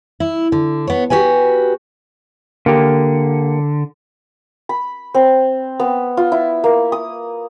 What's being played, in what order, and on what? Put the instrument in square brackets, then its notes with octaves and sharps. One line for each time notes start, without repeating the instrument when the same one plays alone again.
[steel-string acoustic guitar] E4
D3
B3 C#5
F#4 G4 B4 G#5
[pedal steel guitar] D3 [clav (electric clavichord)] A#3 G4
[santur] B5
C4
B3
F4
E4
A#3
D#6